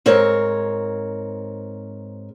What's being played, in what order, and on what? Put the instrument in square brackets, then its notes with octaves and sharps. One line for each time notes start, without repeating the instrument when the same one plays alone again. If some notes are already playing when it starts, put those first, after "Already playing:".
[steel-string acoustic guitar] G#2 C4 A#4 C#5